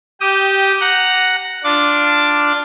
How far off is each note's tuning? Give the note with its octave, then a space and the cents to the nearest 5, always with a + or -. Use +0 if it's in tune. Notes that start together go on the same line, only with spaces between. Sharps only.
G4 -15 G5 +0 D#6 +0
F#5 +0 A#5 +0
D4 +0 F4 +0 D6 +0